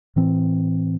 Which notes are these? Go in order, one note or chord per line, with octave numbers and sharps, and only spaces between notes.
A2 E3 C4